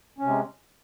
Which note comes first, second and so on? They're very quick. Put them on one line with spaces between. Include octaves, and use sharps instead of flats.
C#4 C3 G#3